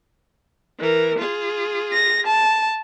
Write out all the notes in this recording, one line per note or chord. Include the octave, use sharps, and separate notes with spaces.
E3 A#4
F4 G#4
A#6
A5